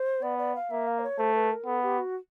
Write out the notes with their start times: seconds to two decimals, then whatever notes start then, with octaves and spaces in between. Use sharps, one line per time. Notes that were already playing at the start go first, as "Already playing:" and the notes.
Already playing: C5
0.22 B3 D5
0.38 D5
0.55 F5
0.71 A#3 E5
0.87 F5
0.99 C5
1.03 C#5
1.19 A3 C5
1.35 B4
1.51 A#4
1.66 B3 A4
1.83 G4
1.99 F#4